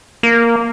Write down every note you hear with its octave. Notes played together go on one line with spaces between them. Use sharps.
A#3